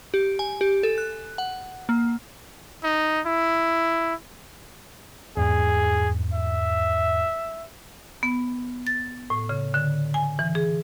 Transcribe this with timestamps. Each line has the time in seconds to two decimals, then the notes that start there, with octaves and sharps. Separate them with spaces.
0.14 G4
0.39 G#5
0.61 G4
0.83 A4
0.98 F#6
1.38 F#5
1.89 A#3
2.83 D#4
3.26 E4
5.37 E2 G#2 G#4
6.33 E5
8.23 B3
8.87 A6
9.30 A2
9.49 C#3
9.74 D3
10.14 G#5
10.39 E3
10.55 G#4